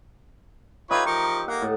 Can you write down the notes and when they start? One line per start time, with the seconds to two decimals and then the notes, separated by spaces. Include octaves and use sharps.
0.91 D#4 F4 G4 B4 C#5 E5
1.06 F3 A#4 C#6
1.48 A#3 F#5
1.62 A2